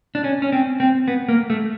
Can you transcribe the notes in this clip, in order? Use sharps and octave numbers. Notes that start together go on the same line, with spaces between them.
D4
C#4
C#4
C4
C4
B3
A#3
A3